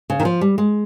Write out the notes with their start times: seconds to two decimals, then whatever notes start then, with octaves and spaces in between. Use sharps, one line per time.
0.10 C#3
0.20 D#3
0.25 F3
0.41 G3
0.58 G#3